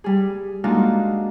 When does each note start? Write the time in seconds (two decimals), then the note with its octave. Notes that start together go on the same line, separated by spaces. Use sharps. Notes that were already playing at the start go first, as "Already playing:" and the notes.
0.04 G3 G#4
0.64 G#3 A#3 D4 D#4 F4 F#4